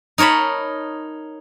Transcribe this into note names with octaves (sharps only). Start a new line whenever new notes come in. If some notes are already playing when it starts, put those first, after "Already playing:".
D#4 A#4 C#5 A5 B5